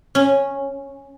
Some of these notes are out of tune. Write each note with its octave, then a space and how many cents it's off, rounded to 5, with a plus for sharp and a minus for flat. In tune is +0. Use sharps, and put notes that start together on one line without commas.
C#4 -10